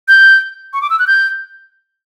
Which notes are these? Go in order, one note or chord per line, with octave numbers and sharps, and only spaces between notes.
G6
C#6
D6
E6
F#6
G6